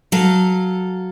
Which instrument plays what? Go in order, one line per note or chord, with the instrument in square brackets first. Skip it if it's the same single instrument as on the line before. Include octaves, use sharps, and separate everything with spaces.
[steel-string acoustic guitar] F#3 A4 F5